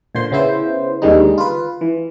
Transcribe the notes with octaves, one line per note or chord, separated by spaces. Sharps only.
A#2 D3 C5 C6
C#3 B3 E4 C5
D#2 D3 D#3 G3 G#3 D#4
F4 B4
E3